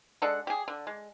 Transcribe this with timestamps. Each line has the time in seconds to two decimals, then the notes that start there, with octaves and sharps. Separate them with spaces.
0.22 G#3 D4 A4 F#5
0.47 G4 G#4
0.68 D3
0.87 G#3